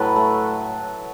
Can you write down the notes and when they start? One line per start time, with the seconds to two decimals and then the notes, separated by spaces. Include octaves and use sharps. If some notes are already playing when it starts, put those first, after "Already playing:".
Already playing: A2 F#3 A4 B4
0.16 A3